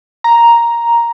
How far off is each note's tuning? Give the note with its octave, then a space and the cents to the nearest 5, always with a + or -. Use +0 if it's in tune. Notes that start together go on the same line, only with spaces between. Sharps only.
A#5 +5